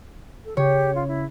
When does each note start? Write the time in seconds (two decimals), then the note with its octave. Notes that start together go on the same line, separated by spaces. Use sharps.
0.45 A4
0.57 C#3 G4 C#5
0.95 F4
1.08 E4